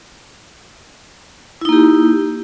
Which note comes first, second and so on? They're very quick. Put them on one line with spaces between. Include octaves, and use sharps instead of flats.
E4 D#4 A#3 G4